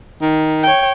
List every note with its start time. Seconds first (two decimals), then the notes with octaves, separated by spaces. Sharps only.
0.21 D#3
0.63 C#5 G5